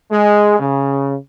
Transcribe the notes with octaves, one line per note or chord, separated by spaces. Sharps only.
G#3
C#3